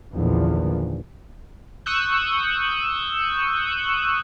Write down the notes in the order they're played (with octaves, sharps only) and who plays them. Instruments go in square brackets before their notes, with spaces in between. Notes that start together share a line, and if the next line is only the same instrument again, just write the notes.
[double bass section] A#1 E2 A#2 D3 D#3 F3
[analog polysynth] C#6 D#6 E6 F#6 G6